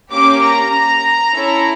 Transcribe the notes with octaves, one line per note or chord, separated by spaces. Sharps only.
A#3 C#4 G4 D6
A#5
C#4 E4 A4